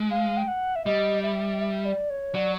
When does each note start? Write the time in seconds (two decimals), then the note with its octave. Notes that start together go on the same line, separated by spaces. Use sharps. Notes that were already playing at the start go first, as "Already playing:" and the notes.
Already playing: G#3
0.11 F5
0.37 G5
0.48 F#5
0.76 E5
0.86 G3 D#5
1.23 E5
1.60 E5
1.85 D5
2.10 C#5
2.35 F#3 D5